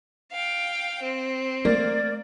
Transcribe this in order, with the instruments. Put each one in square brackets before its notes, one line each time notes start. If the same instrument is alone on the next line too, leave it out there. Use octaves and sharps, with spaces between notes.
[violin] F5 G5
C4
[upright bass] A3 [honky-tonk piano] A#3 [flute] D5